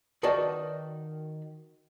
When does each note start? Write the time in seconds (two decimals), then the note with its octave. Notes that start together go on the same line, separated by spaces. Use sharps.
0.23 D#3 F#4 B4 D5 D#5 A5